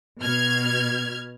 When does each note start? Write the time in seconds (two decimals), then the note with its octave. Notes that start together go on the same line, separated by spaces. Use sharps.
0.22 B2 F6 G#6